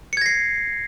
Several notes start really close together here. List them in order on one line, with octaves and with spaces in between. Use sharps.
C#7 G#6 A#6 C7